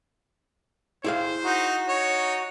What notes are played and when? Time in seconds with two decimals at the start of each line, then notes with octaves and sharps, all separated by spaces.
1.04 E4 G#4 C5 F5
1.44 D#4 F#4
1.89 D#4 C#5